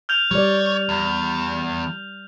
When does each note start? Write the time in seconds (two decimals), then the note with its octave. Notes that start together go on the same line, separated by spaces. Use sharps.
0.09 F6 G6 F7
0.31 G3 C#5 D5
0.89 E2